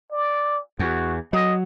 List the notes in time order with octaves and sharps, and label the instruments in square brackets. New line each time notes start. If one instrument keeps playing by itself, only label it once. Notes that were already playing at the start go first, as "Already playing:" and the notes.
[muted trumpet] D5
[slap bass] E2 [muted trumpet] F#4
[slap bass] F#3 [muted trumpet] D#5